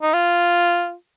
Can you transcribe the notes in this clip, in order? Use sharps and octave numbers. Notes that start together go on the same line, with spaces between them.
D#4
F4